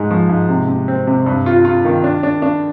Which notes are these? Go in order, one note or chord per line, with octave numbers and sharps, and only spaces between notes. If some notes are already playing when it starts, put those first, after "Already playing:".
Already playing: G#2 G#3
F3
G#2
C3
C3
C4
C3
G2
F4
F4
D#3
D4
D4
D4